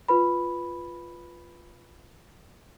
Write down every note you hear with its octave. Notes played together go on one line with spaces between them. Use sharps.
F4 B4 B5